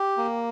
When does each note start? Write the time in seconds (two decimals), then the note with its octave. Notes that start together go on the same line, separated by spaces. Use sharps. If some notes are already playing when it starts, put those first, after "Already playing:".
Already playing: G4
0.17 A#3